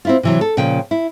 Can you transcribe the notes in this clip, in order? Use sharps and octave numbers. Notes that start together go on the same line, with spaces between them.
C4 E4 F4
C3 E3 F#3
A4
A#2 C#3 F3 G5
E4